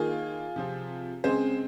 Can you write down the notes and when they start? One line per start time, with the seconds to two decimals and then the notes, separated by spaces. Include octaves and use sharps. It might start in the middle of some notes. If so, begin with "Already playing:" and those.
Already playing: D#3 A#3 F4 G#4
0.56 C3 F3 C4
1.24 C#3 G#3 C4 G#4 C5